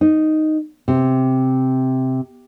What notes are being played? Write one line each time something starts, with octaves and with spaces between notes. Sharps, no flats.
D#4
C3